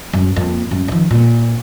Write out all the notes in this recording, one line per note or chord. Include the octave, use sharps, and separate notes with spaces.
F#2
F2 A#3
F#2
D#3 F3
A#2